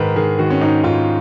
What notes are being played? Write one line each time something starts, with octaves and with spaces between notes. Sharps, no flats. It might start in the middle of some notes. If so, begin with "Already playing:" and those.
Already playing: G#2 D#3 A#4 B4
D#3 G#4
D#3 F#4
C#4
G#2 D#4
G#2 F4